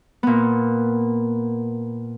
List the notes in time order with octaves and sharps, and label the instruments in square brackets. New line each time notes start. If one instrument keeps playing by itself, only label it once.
[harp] A#2 B3